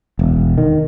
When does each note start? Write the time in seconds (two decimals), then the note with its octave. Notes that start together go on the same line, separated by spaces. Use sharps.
0.19 E1
0.58 D#3